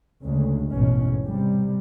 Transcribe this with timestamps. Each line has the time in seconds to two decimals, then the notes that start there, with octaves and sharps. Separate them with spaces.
0.22 D2 C#3 G#3
0.73 A1 E2 G#2 B2 C#4
1.28 C3 G3